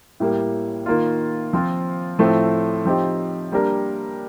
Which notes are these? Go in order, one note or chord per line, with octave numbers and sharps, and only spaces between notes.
A2 G3 A#3
D#3 A#3 F4
F3 C4 F4
A2 F3 A3 C4
F3 C4 D#4 G4
G3 A#3 D4 G4 A#4